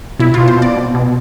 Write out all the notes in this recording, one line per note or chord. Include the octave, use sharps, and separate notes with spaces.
B2 E4
B2 F4
C5
B2 D5
B2
B2